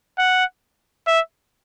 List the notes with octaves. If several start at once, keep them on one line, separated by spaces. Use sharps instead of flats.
F#5
E5